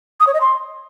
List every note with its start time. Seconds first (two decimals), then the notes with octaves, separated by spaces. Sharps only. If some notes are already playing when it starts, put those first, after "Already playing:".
0.20 D#6
0.27 C#5
0.34 D#5
0.41 C6